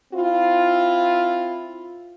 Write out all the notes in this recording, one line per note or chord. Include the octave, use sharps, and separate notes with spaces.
C4 E4 F4